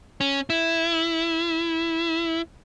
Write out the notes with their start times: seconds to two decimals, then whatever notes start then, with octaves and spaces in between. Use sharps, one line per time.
0.21 C#4
0.50 E4